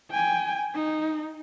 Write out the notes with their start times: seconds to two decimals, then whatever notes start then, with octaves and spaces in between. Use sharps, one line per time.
0.11 G5 G#5
0.75 D#4